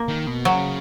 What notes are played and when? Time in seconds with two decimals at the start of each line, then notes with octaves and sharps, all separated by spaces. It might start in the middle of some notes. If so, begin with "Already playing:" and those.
Already playing: A#3
0.08 D#3
0.27 B2
0.45 C#3 F#3